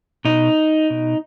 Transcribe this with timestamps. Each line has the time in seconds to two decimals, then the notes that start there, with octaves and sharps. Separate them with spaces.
0.25 B2 D#4
0.90 B2